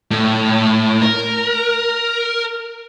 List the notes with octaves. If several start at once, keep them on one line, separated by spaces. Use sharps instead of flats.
A2
A#4